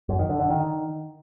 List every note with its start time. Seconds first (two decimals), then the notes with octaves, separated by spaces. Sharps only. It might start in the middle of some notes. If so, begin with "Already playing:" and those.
0.09 F#2
0.19 D#3
0.29 D3
0.40 D3
0.50 D#3